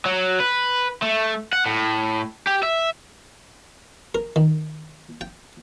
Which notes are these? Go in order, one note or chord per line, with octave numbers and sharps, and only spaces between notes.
F#3
B4
A3
F#5
A2
G4
E5
A#4
D#3
G5